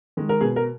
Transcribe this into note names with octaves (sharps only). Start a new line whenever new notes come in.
D#3 G#3
A#4
B2 G#4
A#4